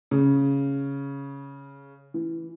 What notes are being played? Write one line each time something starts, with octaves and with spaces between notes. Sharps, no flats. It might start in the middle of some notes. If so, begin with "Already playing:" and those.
C#3
E3